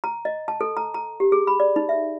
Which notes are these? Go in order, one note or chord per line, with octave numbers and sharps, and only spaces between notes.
A#5
D#5
A5
A4
A#5
A#5
G4
G#4
B5
D5
D#4
E5